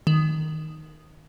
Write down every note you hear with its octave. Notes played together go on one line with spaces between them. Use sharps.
D#3